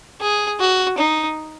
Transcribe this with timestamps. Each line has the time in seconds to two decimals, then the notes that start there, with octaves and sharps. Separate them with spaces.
0.21 G#4
0.60 F#4
0.98 D#4